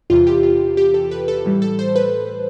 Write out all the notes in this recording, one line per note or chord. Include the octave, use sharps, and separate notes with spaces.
E2 C3 E3 F4
G4
F4
G4
A4
B4
A4
A2 E3 G3
A4
C5
B4